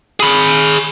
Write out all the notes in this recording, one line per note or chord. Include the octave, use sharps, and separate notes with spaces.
G#4 B5